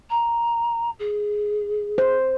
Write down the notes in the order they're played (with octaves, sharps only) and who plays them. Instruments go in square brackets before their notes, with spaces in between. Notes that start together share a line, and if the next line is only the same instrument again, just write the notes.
[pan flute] A#5
G#4
[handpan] C5